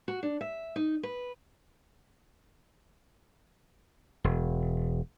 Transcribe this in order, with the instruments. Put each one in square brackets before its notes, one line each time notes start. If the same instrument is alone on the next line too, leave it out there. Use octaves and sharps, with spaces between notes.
[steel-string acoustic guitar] F#4
D4
E5
D#4
B4
[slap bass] E1